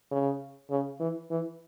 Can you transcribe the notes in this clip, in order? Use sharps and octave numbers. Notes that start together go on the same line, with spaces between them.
C#3
C#3
E3
E3